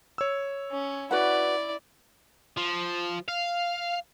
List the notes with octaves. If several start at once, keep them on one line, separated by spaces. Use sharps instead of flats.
C#5 E6
C#4
E4 F#4 B4 D5 F#5
F3
F5